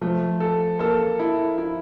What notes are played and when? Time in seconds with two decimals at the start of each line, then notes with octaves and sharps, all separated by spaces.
0.01 F3 A3
0.40 A4
0.79 A#3 A4
1.19 E4
1.58 E4